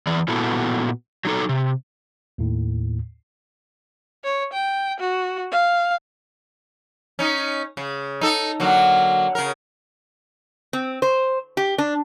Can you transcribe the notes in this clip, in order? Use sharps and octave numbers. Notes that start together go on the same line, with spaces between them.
E2 E3 D5
A#2 B3 E4 F#4 A4
F#3 D#4 A4
C3
D#2 A2
C#5
G5
F#4
F5
C#4 D#4
C#3
D#4 A4
D3 F#3 A#3
C#3 A#4
C4
C5
G4
D4